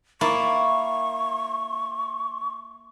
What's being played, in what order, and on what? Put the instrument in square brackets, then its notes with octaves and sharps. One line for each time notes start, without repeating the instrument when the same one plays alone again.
[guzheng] A#3 E4 A5 [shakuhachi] C#6